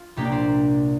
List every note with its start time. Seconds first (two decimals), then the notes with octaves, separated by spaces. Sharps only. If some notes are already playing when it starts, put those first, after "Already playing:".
Already playing: F4
0.16 C2 A#2 A#3 D4 G4
0.25 D5
0.32 G4 C5